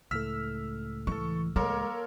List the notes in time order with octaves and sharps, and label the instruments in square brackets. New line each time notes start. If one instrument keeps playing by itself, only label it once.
[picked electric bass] C#2 A2 A3 [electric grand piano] E6 F6 B6
[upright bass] E3 [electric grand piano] A4 C#6
[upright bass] G#3 [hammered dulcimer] A#3 C6 [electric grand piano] A4 A#4 C#5